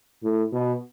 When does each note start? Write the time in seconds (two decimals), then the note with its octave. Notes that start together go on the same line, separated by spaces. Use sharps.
0.23 A2
0.52 B2